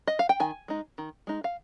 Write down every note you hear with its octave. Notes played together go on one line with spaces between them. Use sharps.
D#5
F5
G5
D#3 G#5
G#3 D#4
D#3
G#3 D#4
F5